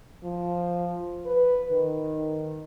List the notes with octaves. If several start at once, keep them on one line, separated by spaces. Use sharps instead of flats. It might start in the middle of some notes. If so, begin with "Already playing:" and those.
F3
B4
D#3